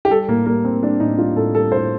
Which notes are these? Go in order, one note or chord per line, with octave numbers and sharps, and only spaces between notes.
G4
G3 A4
A2 A#3
G3 A#3
A2 C4
G3 D4
A2 D#4
G3 F4
A2 A4
G3 A4
A2 C5